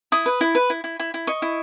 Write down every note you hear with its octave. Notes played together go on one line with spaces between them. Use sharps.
E4 D#6
B4
E4
B4
E4
E4
E4
E4
D#5 C#6
E4